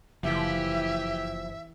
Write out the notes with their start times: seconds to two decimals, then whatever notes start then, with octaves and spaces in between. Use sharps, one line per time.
0.23 F#1 E3 F3 E4 G4 E5